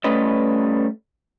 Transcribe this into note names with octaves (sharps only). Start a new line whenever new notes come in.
G3 A3 C#4 B4 D#5